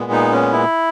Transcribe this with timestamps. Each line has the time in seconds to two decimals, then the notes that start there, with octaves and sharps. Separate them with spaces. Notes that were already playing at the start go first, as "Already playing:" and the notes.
Already playing: A#2 G#3 B3
0.12 D#4
0.32 C#4
0.52 E4